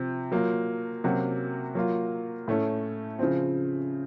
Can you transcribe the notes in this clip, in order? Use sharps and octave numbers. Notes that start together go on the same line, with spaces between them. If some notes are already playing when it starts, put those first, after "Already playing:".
Already playing: C3 F3 C4
F#3 A#3 F4
C3 F#3 A#3 C#4 F#4
F#3 A#3 F4
A2 A3 C#4
C#3 F3 C4